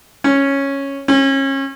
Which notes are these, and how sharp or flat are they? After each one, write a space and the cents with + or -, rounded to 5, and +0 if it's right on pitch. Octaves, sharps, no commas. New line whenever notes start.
C#4 -5
C#4 -30